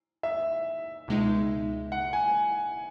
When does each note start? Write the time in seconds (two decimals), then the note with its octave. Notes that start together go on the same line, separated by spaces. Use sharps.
0.23 E5
1.08 C#2 B2 G#3 D#4
1.92 F#5
2.13 G#5